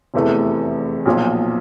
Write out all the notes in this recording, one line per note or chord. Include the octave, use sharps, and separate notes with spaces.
F1 E2 C3 E3 A3
B1 A#2 F3